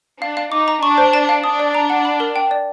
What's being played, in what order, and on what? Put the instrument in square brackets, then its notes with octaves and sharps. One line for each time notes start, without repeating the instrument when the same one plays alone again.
[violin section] D4 [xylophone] F5
[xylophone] F5
[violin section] D#4 [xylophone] D6
[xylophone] A#5
[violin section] D4 [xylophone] C#6
[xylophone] C5
A5
F5
[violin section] D4 [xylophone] D#6
[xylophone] D5
A#5
F#5
B5
A#4
G5
D5